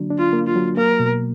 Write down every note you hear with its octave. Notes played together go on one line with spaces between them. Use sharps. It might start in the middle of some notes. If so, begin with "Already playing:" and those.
Already playing: D3 F#3 A#3 D4
D4
F4
A#3
F4
F#3
A#3 A#4
B2